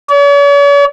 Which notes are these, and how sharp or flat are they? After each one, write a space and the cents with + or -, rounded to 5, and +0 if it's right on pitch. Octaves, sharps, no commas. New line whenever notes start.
C#5 +45